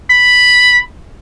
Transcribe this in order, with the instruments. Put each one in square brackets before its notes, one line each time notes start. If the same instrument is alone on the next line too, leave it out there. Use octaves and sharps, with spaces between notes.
[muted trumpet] B5